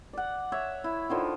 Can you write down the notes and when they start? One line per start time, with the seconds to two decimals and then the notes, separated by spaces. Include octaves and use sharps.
0.13 D5 F#5
0.52 C#5 E5
0.84 E4
1.10 D3 D#3 F3